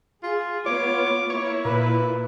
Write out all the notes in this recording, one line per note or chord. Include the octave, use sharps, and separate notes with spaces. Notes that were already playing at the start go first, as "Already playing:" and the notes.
F4 G#4
B3 F4 C#5 D6
A#3 E4 C#5
A#2 B4